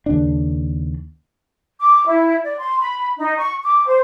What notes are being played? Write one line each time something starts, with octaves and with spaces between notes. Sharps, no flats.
D#2 C#3 D4
D6
E4
D5
C6
B5
D#4
C#6
D6
C5